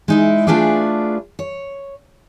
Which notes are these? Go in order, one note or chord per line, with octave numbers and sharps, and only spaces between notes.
G#3 D#4 E4
A3 D4 F4 G#4 B4 D5
C#5